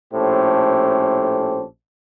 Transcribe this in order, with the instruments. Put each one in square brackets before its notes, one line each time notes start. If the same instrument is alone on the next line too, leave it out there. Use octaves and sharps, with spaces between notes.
[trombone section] A#1 A2 C#4 G4 A4 C5